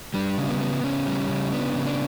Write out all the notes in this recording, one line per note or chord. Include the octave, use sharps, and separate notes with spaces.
G3 D4
C#3
B3
B3
C#3 C#4
G3
C#3
B3 D4
C#3
D4